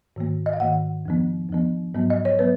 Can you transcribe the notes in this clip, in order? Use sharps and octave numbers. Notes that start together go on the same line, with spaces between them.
G#2 D#3 A#3
D#5
F5
G#2 D#3 A#3 F#5
F2 F3 B3
F2 F3 B3
G#2 F#3 B3
D#5
C#5
F#3 B3 B4